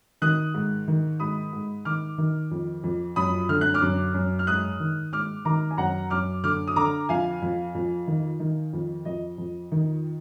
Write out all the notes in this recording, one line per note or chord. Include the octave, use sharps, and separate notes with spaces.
D#3 D#6 F#6
G#2
D#3
G#2 B5 D#6
G#2
D#3 D6 F6
D#3
F2
F2
F#2 B5 D#6
D3 F6
F#6
D6 F6
F#2
F#2
F6
G#2 D#6 F#6
D#3
G#2 D6 F6
D#3 A#5 D6
G#5
F#2 F#5 A#5
F#2 D6 F6
D3 D6 F6
D#6
D3 A#5 D6
F2 F5 G#5
F2
F2
D#3
D#3
F2
F2 D#5
F2
D#3